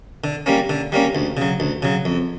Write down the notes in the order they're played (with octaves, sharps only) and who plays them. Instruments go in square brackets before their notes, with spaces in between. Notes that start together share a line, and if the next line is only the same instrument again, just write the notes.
[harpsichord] D3
G3 A#3 C#4
D3
G3 A#3 C#4
D2
C#3 F#3
D2
C#3 F#3
F2